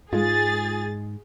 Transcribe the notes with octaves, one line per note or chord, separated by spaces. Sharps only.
G#2 G#3 F4 G#4 A6